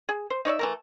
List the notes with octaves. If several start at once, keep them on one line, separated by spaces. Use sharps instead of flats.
G#4
C5
D#4 C#5 D5 E5
E3 A3 A#4